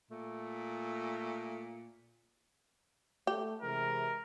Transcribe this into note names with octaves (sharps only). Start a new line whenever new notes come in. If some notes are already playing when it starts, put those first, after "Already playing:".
A#2 A3
A3 G4
C3 E3 G#3 A#4